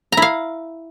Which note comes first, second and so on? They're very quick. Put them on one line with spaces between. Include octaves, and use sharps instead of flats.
A#5 E4 F5